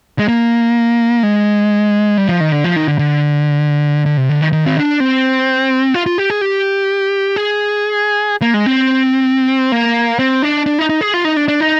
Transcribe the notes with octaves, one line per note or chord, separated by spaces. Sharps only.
G#3
A#3
G#3
G3
F3
D#3
D3
F3
D#3
D3
D3
D3
C3
D3
D#3
D#3
C4
D4
C4
F4
F4
G4
G#4
G4
G#4
A#3
G#3
C4
A#3
C4
D4
D4
D#4
D#4
G#4
F4
D#4
D4
D4
D#4